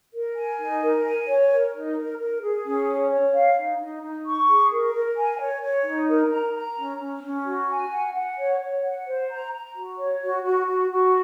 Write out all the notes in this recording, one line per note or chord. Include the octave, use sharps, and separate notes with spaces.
A#4
G#5
D#4
A#4
G#5
C#5
A#4
D#4
A#4
A#4
G#4
C#4
C#5
C#5
F5
D#4
D#4
D#4
C#6
G#4
A#4
A#4
G#5
C#5
C#5
D#4
A#4
A#5
A#5
C#4
C#4
C#4
F#4
G#5
F#5
F#5
C#5
C#5
F#5
C5
A#5
A#5
F#4
C#5
F#4
F#4
F#4
F#4